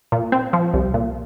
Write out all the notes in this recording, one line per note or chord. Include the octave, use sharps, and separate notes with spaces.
A#2
C4
F3
C2
A#2